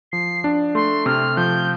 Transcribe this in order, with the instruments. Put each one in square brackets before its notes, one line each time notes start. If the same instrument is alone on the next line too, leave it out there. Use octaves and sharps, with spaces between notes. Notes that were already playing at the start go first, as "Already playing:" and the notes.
[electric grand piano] F3 [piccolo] C7
[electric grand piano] D4
[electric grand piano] A3 [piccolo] C6
[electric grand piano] C3 [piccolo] F6
[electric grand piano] F3 [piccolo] G6